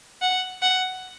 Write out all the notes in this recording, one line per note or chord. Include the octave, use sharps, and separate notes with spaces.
F#5
F#5